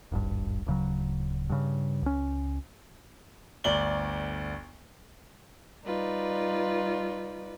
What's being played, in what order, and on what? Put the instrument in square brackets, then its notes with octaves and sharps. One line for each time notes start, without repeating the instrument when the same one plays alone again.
[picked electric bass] D#1 G#1 G2
D1 C#3 F#3
G2 C#3
C#2 C#4
[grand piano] G1 D2 D5 F#7 G7
[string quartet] G3 D#4 F4 B4 D5